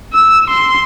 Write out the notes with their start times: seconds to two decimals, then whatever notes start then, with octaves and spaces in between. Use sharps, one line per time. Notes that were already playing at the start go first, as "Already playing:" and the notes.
0.13 E6
0.50 C6